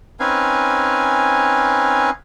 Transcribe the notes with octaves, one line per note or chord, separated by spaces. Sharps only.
C4 C#4 D#4 B4 F5 G#5